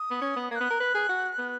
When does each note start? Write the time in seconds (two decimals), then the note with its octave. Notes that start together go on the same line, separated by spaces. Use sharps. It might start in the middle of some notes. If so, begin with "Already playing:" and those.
Already playing: D#6
0.11 B3
0.22 C#4
0.36 B3
0.51 A#3 G#6
0.55 F#6
0.60 B3
0.71 A#4
0.80 B4
0.95 G#4
1.09 F#4
1.38 B3